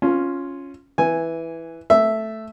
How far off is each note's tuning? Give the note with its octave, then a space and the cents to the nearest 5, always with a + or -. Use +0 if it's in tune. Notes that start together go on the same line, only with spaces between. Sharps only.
C#4 +0 F4 +0
E3 +0 G#5 -5
A3 +0 E5 +0